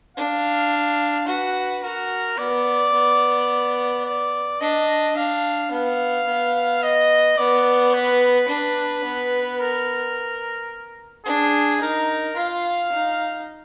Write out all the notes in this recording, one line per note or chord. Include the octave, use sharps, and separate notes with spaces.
D4 F5
F#4 B4
F#4 A#4
B3 D5
B3
D5
D4 D#5
D4 F5
B3 F5
B3
D#5
B3 D5
B4
D4
B3
A#4
D4 G#4
D#4 A#4
F4 F5
D#4